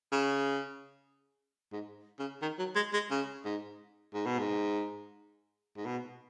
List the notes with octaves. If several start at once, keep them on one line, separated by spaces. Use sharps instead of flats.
C#3
G#2
C#3
D#3
F#3
G#3
G#3
C#3
G#2
G#2
B2
G#2
G#2
B2